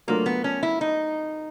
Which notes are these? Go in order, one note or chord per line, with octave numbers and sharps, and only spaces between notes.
F#3 A3 A#3 D4 F4 A#4
B3
C#4
E4
D#4